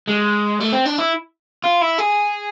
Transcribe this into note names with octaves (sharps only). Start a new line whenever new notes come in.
G#3
A3
C4
D4
E4
F4
E4
G#4